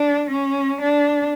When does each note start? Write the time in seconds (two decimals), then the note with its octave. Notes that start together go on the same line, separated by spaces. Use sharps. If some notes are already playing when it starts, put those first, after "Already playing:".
Already playing: D4
0.30 C#4
0.81 D4